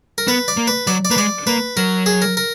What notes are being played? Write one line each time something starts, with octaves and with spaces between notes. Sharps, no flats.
A#4
B3 B4
D5
A#3
B4
F#3 D5
D5
A#3 B4
G#3 D5
A#3 B4
F#3 A#4
G#4
A#4
A#4